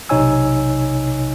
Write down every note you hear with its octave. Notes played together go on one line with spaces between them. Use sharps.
B1 C3 D#4 C#5 G#5 E6